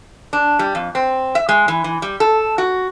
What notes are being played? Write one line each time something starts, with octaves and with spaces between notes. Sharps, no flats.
D4
G3
F2
C4
E5
G#3
E3
E3
G3
A4
F#4